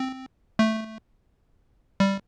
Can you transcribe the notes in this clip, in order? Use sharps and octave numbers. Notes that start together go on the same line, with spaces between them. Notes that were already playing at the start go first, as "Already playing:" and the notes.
Already playing: C4
A3
G3